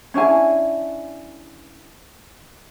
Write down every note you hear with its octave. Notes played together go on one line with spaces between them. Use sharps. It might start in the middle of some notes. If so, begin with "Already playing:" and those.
C#4 D4 E4 G#5